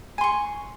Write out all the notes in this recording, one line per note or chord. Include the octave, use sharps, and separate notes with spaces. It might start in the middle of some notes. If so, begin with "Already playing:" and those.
G#5 C6 C#6